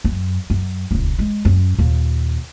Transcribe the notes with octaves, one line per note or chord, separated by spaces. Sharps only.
F#2
F#2
D#1 C#2
G#3
F#2
D#2 A#2